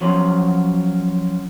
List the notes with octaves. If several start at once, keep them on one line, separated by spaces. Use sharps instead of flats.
F3 F#3 C#4 C5